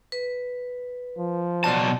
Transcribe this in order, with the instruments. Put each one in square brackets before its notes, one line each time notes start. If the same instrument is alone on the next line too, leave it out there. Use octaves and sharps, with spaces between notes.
[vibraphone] B4
[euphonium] F3
[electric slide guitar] B2 F#3 A5 [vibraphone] D5 C6